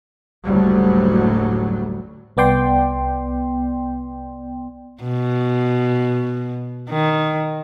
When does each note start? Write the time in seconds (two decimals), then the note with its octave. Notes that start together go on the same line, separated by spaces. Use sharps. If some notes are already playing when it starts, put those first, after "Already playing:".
0.44 F#1 D2 A2 F#3 G3
2.37 C2 B3 D5 G5 C6
5.03 B2
6.90 D#3